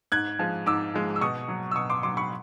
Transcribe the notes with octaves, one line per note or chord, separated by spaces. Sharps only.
G#2 F#6 G#6
F3 G#3
G#2 D6 E6
F3 G#3
E6
B2 C#6 D#6
F#3
E6
B2 C#6 D#6
C6 D6
F#3 C6 D6
B5 C#6